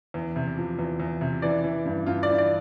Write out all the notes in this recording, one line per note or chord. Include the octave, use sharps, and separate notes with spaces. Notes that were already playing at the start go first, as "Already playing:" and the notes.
E2
C3
F3
E2
E2
C3
E3 D5
E3
G2
G2 F4
E3 D5
D5